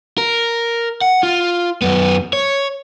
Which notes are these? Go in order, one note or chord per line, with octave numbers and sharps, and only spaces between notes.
A#4
F#5
F4
F#2 B3
C#5